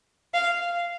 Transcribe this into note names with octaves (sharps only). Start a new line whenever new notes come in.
F5